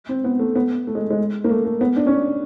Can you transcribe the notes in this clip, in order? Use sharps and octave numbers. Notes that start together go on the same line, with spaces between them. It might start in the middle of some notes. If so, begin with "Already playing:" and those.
C4
B3
A3
B3
A3
G#3
G#3
A#3
A3
A3
B3
D4
C#4
D4